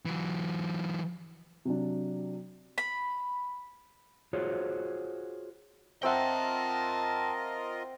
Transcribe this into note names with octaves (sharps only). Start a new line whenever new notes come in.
E3 F#3
C3 F#3 D4
B5
F4 F#4 G#4 C5 C#5
C4 F4 A#4 D#5 E5 F#5 G5 A5